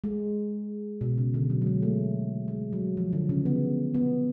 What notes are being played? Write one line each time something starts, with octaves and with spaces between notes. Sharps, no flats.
G#3
B2
C#3
D3
F#3
F#3
G#3
A3
G#3
F#3
F3
D3
C#3
B3
B3